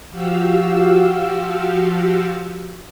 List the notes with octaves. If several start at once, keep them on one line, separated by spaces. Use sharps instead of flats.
F3 F#4 G4 F5 E6